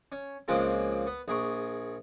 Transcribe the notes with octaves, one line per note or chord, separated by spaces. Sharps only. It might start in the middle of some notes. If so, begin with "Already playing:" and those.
C#4
C#2 C#3 F3 G#3 A#3 C4
B3
A#1 G#4 A#4 C#6